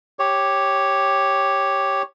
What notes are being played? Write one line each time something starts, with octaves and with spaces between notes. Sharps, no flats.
G4 C#5